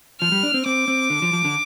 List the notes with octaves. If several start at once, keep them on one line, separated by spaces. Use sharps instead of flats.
F3 F6
G3
D4
C4
C4 D6
C4
D3
F3
F3
D3